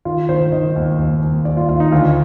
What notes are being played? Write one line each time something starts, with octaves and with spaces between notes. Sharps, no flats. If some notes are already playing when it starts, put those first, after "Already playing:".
D#3 F4
D#3 C5
D#3 D#5
D#2
D#2
D#2
D#2 D5
F4
D#2 F4
D#4
D2 F4